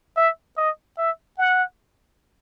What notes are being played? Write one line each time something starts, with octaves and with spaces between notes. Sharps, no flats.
E5
D#5
E5
F#5